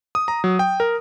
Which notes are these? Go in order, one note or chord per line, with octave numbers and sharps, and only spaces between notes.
D#6
A#5
F#3
G5
A#4